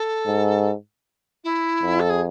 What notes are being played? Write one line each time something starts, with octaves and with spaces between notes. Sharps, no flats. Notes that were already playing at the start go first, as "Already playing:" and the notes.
Already playing: A4
G#2
E4
F2
A4
G#4